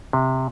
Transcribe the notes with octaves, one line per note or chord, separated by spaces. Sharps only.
C3